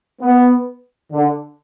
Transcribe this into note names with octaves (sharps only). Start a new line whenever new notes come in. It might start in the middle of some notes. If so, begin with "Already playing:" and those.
B3
D3